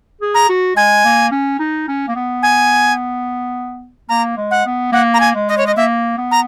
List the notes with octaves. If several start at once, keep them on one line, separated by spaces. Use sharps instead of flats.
G#4
A#5
F#4
G#3 G#5
A#3
C#4
D#4
C#4
A#3
B3
G#5
A#3 A#5
G#3
F#5
B3
A#3 F#5
A#5
G#5
G#3
D#5
C#5
D#5
A#3 E5
B3
A#5